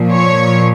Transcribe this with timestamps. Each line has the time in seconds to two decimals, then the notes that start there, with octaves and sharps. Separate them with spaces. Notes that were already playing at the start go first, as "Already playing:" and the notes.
Already playing: A#2 F3
0.13 C#5